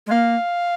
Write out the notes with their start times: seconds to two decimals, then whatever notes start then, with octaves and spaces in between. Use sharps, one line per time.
0.06 G#3
0.11 A#3 F5